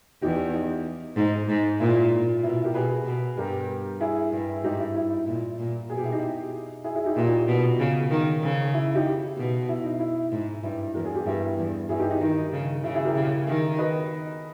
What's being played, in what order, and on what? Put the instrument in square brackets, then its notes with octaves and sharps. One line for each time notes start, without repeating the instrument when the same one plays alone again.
[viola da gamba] E2 [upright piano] D#4 G4
[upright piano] D#4
[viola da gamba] G#2 [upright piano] D#4
[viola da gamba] G#2
[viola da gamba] A#2 [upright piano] E4
[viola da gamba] B2 [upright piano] E4
[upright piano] G4 A#4
[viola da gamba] B2 [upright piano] G#4 B4
[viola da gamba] B2
[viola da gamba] G2 [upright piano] G4 A#4
[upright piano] E4 G#4
[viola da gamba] G2
[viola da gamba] G#2 [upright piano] D#4 G4
[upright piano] E4
E4
[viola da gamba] A#2
A#2
[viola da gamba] B2 [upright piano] G#4
[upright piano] G4
E4
D#4 G4
E4 G#4
E4 G#4
D#4 G4
[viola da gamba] A#2 [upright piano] E4
[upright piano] D#4 G4
[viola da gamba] B2
C#3
D#3
C#3
[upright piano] E4
D#4 G4
[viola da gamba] B2
[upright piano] E4
D#4
E4
[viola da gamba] G#2
[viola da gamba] G2 [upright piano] E4
[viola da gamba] E2 [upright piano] A#4
[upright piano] G#4
G4
[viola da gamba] G2 [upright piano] E4
[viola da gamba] E2
[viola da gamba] G2 [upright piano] E4 G#4
[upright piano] D#4 G4
D#4
[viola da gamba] D#3 [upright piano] D#4
[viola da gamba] C#3
[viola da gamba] C#3 [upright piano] E4
[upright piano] E4 G#4
G4 A#4
[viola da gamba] C#3
D#3
[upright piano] B4 D#5